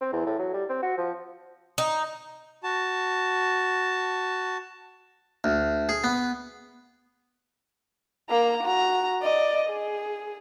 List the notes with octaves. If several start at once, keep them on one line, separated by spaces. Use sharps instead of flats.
C4
E2
A2
F#3
G3
C4
F#4
F3
D#4
F#4 A5
D2
G#4
B3
A#3 A#5
F#4 A#5
D5 D#5
G#4